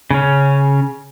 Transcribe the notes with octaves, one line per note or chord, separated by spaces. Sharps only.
C#3 C#4